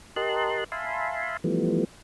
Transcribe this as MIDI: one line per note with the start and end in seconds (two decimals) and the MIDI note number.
0.16 0.64 67
0.16 0.64 70
0.16 0.64 75
0.16 0.64 81
0.16 0.64 84
0.16 0.64 90
0.72 1.37 76
0.72 1.37 77
0.72 1.37 80
0.72 1.37 81
0.72 1.37 83
0.72 1.37 84
1.44 1.85 52
1.44 1.85 53
1.44 1.85 55
1.44 1.85 57
1.44 1.85 59